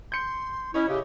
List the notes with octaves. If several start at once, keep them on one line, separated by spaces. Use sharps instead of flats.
C6 G6 C#7
C#4 E4 C#5 D#5 B5
C#3 E4 G4